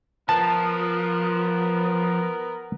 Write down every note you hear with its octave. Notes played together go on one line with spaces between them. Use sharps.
F3 B3 A#4 A5